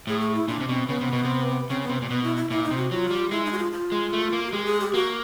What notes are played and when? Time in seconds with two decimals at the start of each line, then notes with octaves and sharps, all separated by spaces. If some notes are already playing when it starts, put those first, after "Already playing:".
0.07 A2 G#4
0.21 G#4
0.35 E4
0.48 A#2 D4
0.60 C3
0.69 B2 C4
0.88 C#3 B3
1.01 C3
1.13 B2
1.25 C3
1.69 C#3 C4
1.83 B3
1.90 C3
2.02 A#2
2.10 B2 B3
2.24 E4
2.37 E4
2.50 A#2 E4
2.64 D#4
2.71 C3
2.77 F#4
2.91 F#3 F4
3.11 G3
3.31 G#3 E4
3.45 D#4
3.52 F#4
3.58 F4
3.72 F4
3.92 G#3
4.13 A3
4.33 A#3
4.46 F#4
4.53 G#3 G4
4.66 G#4
4.80 G4
4.93 A#3 F#4